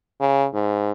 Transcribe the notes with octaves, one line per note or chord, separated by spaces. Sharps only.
C#3
G#2